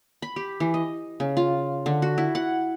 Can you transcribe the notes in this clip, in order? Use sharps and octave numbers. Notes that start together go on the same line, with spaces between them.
B5
G4
E3
D#5
C#3
F4
D3
F#4
E4
F#5